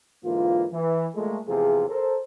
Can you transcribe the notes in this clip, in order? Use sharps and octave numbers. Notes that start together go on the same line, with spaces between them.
G#2 D3 E3 A#3 F4
E3
A#2 G#3 A3
E2 C3 F3 F4 G#4
A4 A#4 C5